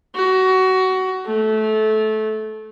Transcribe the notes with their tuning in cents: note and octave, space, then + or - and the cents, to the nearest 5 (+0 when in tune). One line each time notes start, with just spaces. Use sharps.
F#4 +20
A3 -20